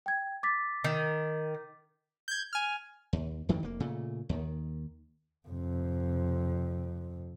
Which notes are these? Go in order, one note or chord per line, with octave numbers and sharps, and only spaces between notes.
G5 G#6
D6 A6 B6
D#3
G6 G#6
G#5 F6
D#2
F2 D#3 E3 G3
F1 A#3
A#2 C#3 A3
D#2 D#3
F2 C3